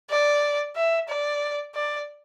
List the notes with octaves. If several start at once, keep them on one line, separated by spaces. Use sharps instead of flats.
D5
E5
D5
D5